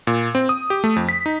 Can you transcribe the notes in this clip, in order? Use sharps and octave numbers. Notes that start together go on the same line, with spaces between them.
A#2
C4
D#6
G4
A3
F2
B6
D#4